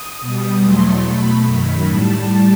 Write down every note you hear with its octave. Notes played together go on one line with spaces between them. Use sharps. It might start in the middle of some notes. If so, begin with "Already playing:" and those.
Already playing: D#6
B2 G3
E2 B2 F#3 A3 C6
B2 A3 B5
F#2 D#3 F#3
A2 G3 A5